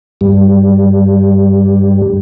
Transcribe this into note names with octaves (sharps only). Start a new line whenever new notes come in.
G2 G3